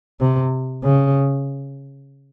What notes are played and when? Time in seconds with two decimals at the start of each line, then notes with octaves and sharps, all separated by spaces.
0.20 C3
0.83 C#3